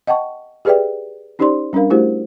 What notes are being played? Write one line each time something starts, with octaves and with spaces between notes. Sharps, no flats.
D#5 F#5 G5 A5 C#6
G4 G#4 B4 D5 E5 G5
C#4 D#4 G4 C5 D5 C6
G3 C#4 D4 A#4 F5
A3 E4 F#4 G4 C5